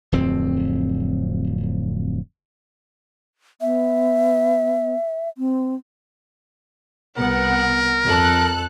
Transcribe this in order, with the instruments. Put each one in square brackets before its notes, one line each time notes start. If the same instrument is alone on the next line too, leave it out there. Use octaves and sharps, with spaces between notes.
[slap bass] D1 F2 C4
[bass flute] B3 [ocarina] E5
[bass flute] C4
[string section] C2 B3 F#5 [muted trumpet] A#4
[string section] F2 A4 F#6